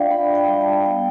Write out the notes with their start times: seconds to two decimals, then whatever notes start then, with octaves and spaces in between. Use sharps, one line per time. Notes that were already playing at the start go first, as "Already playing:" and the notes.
Already playing: D4 F4 D5 E5 F5 G5
0.11 D4 B5
0.35 G5
0.48 G3
0.61 A5
0.86 B3 G5